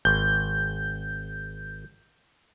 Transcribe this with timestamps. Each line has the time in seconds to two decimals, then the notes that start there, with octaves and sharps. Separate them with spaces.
0.05 G#1 G6